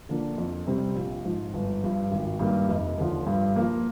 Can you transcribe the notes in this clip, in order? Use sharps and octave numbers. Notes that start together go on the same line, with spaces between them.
D3 F3 A#3 D4
F2
C3 G3 C4
A#1
G#2 F3
G1
G2 F3
G#1
G2 D#3 A#3
F1
D#2 D3 F3
G2
F3 A#3